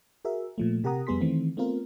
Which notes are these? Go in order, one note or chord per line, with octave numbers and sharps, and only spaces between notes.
F#4 G#4 A#4 E5
A#2 F3 A3
C3 G4 A#4 F#5 A#5 D#6
F2 G3 B3 G#4 C6 B6
D#3 E3 A3 C4
A3 B3 C4 F4 A#4